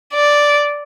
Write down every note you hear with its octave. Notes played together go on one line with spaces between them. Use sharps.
D5